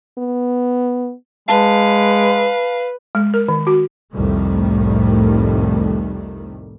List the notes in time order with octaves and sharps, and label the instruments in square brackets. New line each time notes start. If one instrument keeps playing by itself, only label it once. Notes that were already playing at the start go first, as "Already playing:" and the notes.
[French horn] B3
[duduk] G#3 [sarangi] B4 [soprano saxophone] F5 [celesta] A5
[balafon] G#3
A#4
D#3
F#4
[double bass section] C2 F2 A2 D#3 G3 A3